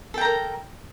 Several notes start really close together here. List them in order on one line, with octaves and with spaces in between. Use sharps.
A4 G5 A#5 A#4